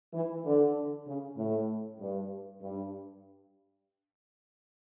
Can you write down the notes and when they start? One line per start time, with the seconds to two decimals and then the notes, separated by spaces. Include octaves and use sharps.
0.14 E3
0.44 D3
1.06 C#3
1.37 A2
1.99 G2
2.61 G2